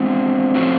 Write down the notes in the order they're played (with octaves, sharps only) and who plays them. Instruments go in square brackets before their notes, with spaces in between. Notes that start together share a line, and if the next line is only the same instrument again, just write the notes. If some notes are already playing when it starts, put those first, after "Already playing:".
Already playing: [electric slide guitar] G#3 B3 D4 F4 [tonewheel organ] C4
[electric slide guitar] A2 F3 A3 C#4 F#4